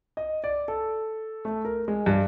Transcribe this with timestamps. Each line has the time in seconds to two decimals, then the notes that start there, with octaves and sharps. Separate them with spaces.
0.17 D#5
0.44 D5
0.68 A4
1.45 A3
1.65 A#4
1.88 G#3
2.06 G2